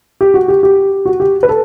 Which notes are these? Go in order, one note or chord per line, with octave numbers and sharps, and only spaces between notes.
G4
F#4
G4
G4
F#4
G4
B4
A4